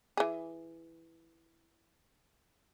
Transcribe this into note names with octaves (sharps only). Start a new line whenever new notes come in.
E3 G#4